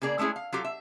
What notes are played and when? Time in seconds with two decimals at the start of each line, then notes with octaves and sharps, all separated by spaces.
0.02 C#3 A#3 G#4 D5 A#5
0.18 G#3 A3 C#4 E4 G#4
0.36 F5
0.53 F#3 F4 G4 A4 F5
0.65 E5